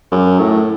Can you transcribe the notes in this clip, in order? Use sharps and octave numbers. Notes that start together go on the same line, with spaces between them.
F#2
A2